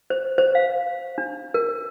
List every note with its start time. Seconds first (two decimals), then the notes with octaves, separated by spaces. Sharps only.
0.10 C5
0.38 C5
0.55 F5
1.18 D4
1.54 A#4